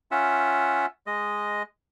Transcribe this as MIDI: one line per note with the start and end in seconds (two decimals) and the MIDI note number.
0.11 0.86 61
0.11 0.86 65
0.11 0.86 76
0.11 0.86 78
1.07 1.63 56
1.07 1.63 75